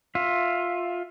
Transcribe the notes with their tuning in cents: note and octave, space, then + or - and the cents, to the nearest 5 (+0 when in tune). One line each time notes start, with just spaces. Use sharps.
F4 +15 E5 +5